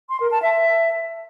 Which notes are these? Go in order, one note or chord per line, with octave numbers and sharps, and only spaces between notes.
C6
A#4
A5
E5